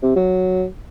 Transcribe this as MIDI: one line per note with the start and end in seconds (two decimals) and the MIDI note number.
0.02 0.15 48
0.16 0.65 54